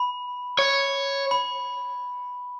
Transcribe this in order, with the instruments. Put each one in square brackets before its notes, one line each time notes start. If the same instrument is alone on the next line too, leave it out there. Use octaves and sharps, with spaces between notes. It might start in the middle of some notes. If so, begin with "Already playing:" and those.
Already playing: [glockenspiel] B5
[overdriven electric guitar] C#5
[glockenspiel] B5